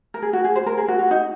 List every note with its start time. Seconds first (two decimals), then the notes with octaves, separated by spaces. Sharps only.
0.14 A#4
0.22 G#4
0.33 F#4
0.45 G#4
0.56 C5
0.66 A#4
0.77 G#4
0.88 F#4
0.99 F#4
1.11 D#4